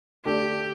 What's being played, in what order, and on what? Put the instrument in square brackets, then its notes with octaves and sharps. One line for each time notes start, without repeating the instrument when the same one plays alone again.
[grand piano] D3 A3 D4 A4 D5 [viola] G4